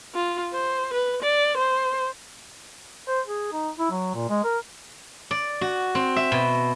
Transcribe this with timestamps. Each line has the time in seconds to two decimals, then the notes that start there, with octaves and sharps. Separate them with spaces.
0.15 F4
0.53 C5
0.94 B4
1.23 D5
1.57 C5
3.08 C5
3.27 G#4
3.52 D#4
3.79 E4
3.91 F#3
4.14 A#2
4.29 G#3
4.44 A#4
5.31 D5
5.61 F#4
5.95 C4
6.16 E5
6.32 B2